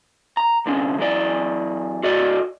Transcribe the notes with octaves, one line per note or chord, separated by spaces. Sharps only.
A#5
C2 D3 C#4
F#2 E3 D5
F#4 A4 D5 D#5